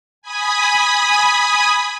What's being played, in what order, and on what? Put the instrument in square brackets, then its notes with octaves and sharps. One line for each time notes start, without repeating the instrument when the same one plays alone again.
[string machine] G#5 B5 D#6